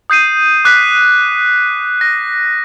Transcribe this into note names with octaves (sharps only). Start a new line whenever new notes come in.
D#6 G6 C7 D#7
D6 F#6 G6 B6
A#6